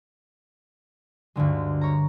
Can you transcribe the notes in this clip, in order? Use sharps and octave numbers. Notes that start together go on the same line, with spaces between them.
D2 G2 D3 G#3
C#5 A#5